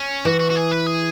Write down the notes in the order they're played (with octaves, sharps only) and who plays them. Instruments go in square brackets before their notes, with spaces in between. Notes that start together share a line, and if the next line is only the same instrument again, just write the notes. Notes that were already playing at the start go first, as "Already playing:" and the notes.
Already playing: [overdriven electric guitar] C#4
[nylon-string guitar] E3 [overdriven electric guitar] F#4
[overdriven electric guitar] F#4
F#4
G#4
B4
G#4